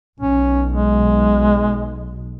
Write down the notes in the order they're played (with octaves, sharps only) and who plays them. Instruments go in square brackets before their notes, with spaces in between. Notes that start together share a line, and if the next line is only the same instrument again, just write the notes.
[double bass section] B1 [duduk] C#4
[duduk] G#3